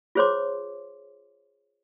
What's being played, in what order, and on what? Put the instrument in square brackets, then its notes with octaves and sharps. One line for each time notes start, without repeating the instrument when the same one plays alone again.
[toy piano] F4 G#4 C5 C#5 C6 D6